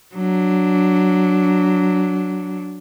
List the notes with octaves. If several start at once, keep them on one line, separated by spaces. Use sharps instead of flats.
F#3 D4